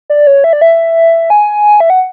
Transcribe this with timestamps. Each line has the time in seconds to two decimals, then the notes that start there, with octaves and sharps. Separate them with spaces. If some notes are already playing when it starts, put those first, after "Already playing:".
0.10 D5
0.27 C#5
0.44 E5
0.53 D5
0.61 E5
1.30 G#5
1.80 E5
1.90 F#5